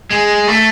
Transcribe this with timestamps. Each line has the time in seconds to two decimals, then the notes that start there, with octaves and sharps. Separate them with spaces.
0.11 G#3
0.47 A3